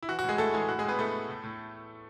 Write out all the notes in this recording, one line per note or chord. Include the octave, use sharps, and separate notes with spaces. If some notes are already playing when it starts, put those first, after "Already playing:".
E4
E3 F#4
F#4
A2
G#3 G#4
A2 A3 A4
E3 G#3 G#4
A2 F#4
G#3 G#4
A2 B3 B4
A2 A3 A4
A2
A2
A2